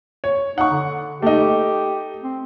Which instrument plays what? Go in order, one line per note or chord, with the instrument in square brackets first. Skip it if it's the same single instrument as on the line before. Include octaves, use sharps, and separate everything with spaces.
[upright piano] C#5
[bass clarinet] D#4 [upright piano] F#5 C#6
[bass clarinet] D3
[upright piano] A3 D#4 [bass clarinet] G4
[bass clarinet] C4